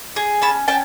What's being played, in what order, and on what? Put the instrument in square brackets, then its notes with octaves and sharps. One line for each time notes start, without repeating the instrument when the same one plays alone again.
[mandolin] G#4
C#4 A5 B5
C#4 G5 A5